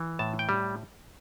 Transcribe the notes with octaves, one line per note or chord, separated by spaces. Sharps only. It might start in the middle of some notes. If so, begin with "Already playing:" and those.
Already playing: E3
A2 A5
G5
G3